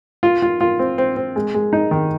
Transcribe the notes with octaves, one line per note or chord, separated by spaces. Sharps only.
F4
F4
F4
C4
C4
C4
G#3
G#3
D#4
D#3